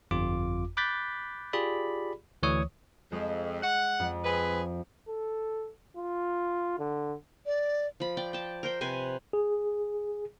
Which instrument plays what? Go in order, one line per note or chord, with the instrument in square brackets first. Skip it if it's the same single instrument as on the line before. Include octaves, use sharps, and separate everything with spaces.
[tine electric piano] G1 F2 F4 D6
B5 D6 F#6 G6 A6 B6
F4 G4 G#4 D5 B5
D2 E3 C#5 C#6 D#6
[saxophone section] F2 [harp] G#3
[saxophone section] F#5
[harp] F2
[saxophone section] C4 G#4 B4
[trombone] A4
F4
D3
[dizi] D5
[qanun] F3 B5
D5 G5
G5 A5
A#4 C5 G5
C3 B4 C5 G#5
[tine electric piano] G#4